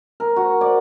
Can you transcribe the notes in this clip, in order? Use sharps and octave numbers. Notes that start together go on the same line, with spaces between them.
A#4
F#4
D5